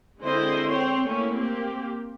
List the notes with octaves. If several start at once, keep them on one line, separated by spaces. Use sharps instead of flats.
D3 G#3 C4 E4 C5 D#5
C4 C5 C#5 G5
A3 A#3 C#4 E4
A#3 C4 G4